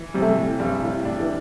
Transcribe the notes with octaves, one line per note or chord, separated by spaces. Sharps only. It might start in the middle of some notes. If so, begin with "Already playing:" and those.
Already playing: E3
C3 G3
A3
G3
A2
G2 G3
A2
A2 D4
E3